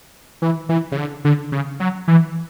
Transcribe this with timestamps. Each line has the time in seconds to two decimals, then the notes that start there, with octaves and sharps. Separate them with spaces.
0.42 E3
0.69 E3
0.92 C#3
0.97 D3
1.25 D3
1.52 C#3
1.80 F#3
2.08 E3